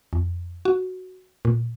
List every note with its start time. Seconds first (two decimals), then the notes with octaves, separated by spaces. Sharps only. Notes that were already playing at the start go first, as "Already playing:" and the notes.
0.13 F2
0.65 F#4
1.45 A#2